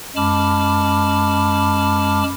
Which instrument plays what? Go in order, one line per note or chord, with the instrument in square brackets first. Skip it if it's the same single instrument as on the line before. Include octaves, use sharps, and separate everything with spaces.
[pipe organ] F#2 G#3 A5 B5 D6 F6